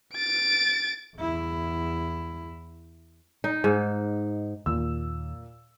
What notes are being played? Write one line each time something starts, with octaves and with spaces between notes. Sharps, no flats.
A6 D7
E2 E4
D#4
G#2
D#2 A#2 E6